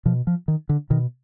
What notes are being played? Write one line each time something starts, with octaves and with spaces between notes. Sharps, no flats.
B2 F3
F3
D#3
D3
B2 D#3